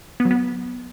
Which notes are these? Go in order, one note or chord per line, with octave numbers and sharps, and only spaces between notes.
B3
F#3
B3